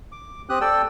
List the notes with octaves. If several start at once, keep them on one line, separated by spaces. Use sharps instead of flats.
D6
C4 G4 D#6 F#6
A4 D5 G5 E6